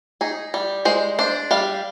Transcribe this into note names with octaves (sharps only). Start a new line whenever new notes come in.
D#4 G#4
G3
G#3 C5
D4 C5
G3 F5